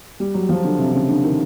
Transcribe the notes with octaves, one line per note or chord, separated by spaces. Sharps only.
G3
F#3
F3
D3
C3
C#3
D3
D#3